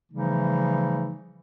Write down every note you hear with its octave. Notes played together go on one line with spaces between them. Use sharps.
C#3 E3 F3 G3 A3 D#4